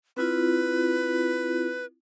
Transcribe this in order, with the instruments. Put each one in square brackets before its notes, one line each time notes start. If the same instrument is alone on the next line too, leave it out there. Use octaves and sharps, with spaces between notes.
[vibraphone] C4 E4 F4 [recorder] B4